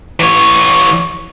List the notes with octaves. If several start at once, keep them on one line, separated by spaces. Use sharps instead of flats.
E3 C#5